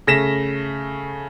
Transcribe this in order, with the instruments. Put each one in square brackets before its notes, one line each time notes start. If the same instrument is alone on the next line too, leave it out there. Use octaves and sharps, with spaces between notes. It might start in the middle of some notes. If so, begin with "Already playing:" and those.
[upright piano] C#3 A3 A#6 B6 E7